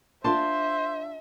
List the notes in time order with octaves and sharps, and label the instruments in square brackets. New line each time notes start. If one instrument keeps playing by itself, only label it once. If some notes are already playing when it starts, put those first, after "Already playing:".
[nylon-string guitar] D4 F4 [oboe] C5 [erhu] E5 [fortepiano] A5 C6